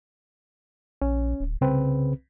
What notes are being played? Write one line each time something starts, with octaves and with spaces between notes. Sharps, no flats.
A#1 C#4
D1
C2 C#3 C4 B4